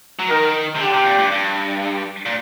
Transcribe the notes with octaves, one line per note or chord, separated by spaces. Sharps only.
F#3
D#3 A#4
C3
D3 G4
C3
A#2
G2
G2
A#2